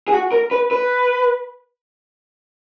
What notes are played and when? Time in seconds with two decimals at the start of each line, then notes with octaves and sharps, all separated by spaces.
0.08 G#4
0.12 F#4
0.32 A#4
0.51 B4
0.71 B4